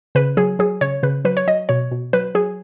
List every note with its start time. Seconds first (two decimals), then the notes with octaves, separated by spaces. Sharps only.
0.15 C#3 B4
0.37 F#3 G#4
0.59 F#3 G#4
0.81 C#3 C#5
1.03 C#3 B4
1.25 F#3 B4
1.37 C#5
1.47 F#3 D#5
1.69 B2 C#5
1.91 B2
2.13 F#3 B4
2.35 F#3 G#4